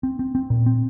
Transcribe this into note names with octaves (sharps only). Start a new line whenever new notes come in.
C4
C4
C4
A#2
C4